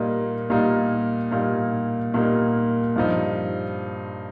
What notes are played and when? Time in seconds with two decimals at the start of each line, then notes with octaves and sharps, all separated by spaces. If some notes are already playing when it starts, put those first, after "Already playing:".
Already playing: A#2 G3 A#3 D#4
0.50 A#2 G3 A#3 D#4
1.31 A#2 G3 A#3 D#4
2.14 A#2 G3 A#3 D#4
2.96 G2 F3 D#4